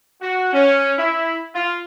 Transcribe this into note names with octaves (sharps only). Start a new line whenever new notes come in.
F#4
C#4
E4
F4